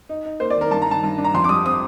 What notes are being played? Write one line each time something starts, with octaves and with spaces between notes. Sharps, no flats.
D#4
D#4
A#3 C5
D5
D#3 A#4
G2 A5
A#5
D#3 A5
G2
D4
A#5
F2 C6
D6
G3 D#6
C4 D#6